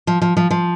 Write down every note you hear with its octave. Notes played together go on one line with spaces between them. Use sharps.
F3
F3
F3
F3